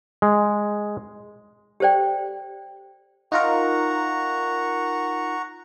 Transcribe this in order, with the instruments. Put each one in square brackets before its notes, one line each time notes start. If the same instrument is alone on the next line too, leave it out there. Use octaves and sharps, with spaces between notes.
[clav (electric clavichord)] G#3
[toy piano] G4 A4 C5 D5 G5
[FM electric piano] D#4 F4 A#4 [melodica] F#5 A#5 C#6